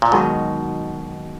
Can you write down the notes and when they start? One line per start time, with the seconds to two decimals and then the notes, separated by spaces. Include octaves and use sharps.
0.02 A#2
0.12 G#2 B2 D#3 F#3